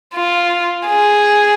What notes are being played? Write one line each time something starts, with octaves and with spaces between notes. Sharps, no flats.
F4
G#4